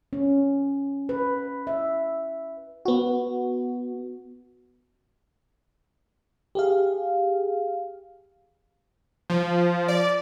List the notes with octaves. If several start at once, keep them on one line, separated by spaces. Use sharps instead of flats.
C#4
B4
E5
B3 F#4
G4 G#4 F5
F3
D5